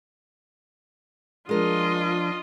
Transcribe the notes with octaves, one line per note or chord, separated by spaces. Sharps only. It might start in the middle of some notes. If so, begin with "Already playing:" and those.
F3 G#3 D4 F4 A#4 D#5